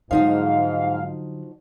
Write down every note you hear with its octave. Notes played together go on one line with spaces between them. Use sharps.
G#2 D3 F3 F#3 D#4 F#4 F5